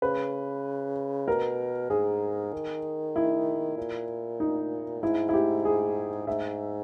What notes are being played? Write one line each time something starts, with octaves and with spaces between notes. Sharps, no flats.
C#3 B4
B2 A#4
G#2 G#4
D#3
E4
A#2
D#4
G#2 E4
E4
G4
G#4
G#2 E5